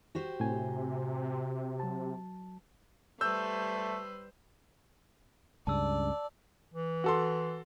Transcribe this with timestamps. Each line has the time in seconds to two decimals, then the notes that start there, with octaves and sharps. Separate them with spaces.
0.15 F#4 G4 C5
0.40 A2 C3 G#5
1.80 F#3 A5
3.21 G3 A3 B4 C5 E6 G6
5.67 C#2 G2 C#3 D5 A5 E6
6.74 E3
7.04 F#4 A4 C6